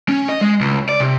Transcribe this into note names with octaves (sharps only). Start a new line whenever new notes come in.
C#4
D#5
G#3
C#2
D5
C3